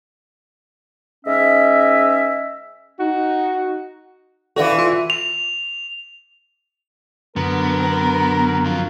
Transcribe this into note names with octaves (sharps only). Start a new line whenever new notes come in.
G#2 C#4 D#5 E5
D#4 F#4
E3 F#4 A4 D5 F5
F4 E5 C6
F7
F#2 D3 B3 A#4
F2 F4